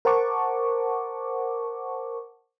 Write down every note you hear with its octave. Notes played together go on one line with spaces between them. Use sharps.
A#4 C5 F#5 A5 C#6 D6